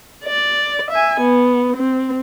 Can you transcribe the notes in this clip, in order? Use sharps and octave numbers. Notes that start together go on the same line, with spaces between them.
D5
E5 G#5
B3
C4